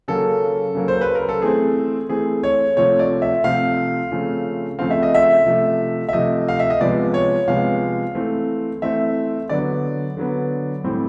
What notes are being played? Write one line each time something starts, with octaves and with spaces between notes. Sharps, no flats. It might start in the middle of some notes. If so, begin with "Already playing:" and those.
C#3 F#3 A#3 A4
C#3 F#3 A#3
C5
B4
A#4
A4
E3 A3 C4 G#4
E3 A3 C4 G#4
C#5
C3 F3 A3 C4 C#5
D5
E5
C3 F3 A3 C4 F5
C#3 F3 A3 C4
C#3 F3 A3 C4 F5
E5
D#5
E5
C3 F3 A3
E5
C3 F3 A3 D#5
F5
E5
D#5
C3 F3 G#3 B3 D5
C#5
C3 F3 G#3 B3 F5
E3 A3 C4
E3 A3 C4 E5
D3 F#3 B3 D5
D3 F#3 B3
A2 E3 G3 C4